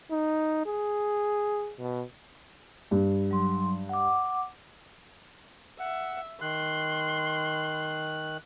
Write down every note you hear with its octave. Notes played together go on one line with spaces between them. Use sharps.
D#4
G#4
B2
G2
F#3 C6
F#5 D6
E5 F#5
D#3 C6 F#6